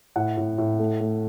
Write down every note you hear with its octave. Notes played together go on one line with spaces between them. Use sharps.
A2 F#5
A2
A2
A3
A3